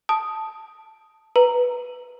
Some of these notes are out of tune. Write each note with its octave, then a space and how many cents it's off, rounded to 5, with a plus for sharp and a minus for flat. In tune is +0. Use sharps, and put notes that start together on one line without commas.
A5 +0 D#6 +0
B4 +0 A#5 -5